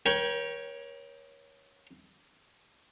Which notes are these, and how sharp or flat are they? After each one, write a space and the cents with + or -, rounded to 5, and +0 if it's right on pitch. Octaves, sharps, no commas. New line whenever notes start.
A#4 +40 C#5 +0 G5 +0